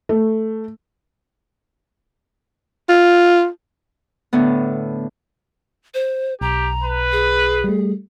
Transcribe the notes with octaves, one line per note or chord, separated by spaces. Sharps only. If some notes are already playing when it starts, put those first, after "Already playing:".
A3
F4
A2 D3 B3
C5
B1 G4 A#5
B4
G#4
G3 A3